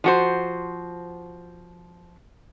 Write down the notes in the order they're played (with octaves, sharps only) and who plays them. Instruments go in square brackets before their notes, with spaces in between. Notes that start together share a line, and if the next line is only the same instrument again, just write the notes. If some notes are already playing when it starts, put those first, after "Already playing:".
[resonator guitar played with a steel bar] F3 F#4 C5